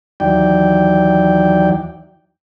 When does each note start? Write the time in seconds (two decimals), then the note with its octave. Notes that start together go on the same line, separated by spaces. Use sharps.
0.20 D#2 E3 F#3 D5 G5